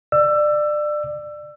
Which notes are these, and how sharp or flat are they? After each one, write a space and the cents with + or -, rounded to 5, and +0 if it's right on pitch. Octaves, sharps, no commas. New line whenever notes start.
D5 +25 E6 +25